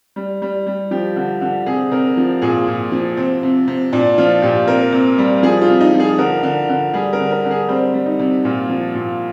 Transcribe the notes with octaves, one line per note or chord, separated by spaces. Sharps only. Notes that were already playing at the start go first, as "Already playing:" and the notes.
G3
G3
G3
F3 G4
D3
D3
C3 G#4
C3 A#4
F3
A#2 G#4
A#2
F3
C3 C4
C3
C3
A#2 D4
F3 F4
A#2 G4
C3 A#4
C3
G3
F3 G#4
F4
C3
D#4
F3
G#4
D3 A#4
D3
D3
G3 G#4
A#4
D3
A#4
D3
G#4
G3 C4
G3
D#4
C3
A#2 F4
F3
A#2